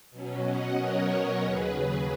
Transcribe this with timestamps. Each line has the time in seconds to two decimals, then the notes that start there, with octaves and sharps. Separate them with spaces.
0.11 B2 F#3 C#4
0.44 D#5 F#5
0.77 A#4 C#5
1.42 D#2 C#3 F#3 G#4 B4
1.75 G#4